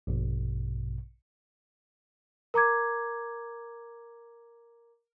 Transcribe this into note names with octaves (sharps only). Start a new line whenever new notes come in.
A#1 G2 B2
A#4 A#5 D6 G#6